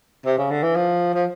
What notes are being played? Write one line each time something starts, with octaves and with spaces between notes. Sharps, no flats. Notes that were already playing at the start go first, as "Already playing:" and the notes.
C3
C#3
D3
E3
F3
F3